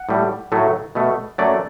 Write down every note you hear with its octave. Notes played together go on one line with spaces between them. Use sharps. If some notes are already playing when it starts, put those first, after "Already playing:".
Already playing: F#5
A2 G3
A2 F#3 A3
B2 A3
F#2 F#3 A3 D5